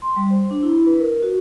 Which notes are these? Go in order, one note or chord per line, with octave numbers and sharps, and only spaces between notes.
C6
G3
C5
D4
E4
B4
A#4
F#4